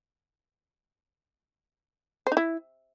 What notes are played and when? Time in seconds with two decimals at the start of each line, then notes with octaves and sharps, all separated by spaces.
2.27 C5
2.32 D#4
2.37 E4